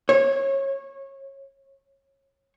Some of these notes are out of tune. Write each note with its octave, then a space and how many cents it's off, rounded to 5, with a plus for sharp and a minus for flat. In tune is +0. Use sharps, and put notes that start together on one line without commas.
C#5 -20